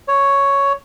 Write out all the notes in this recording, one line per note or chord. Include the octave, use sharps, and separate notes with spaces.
C#5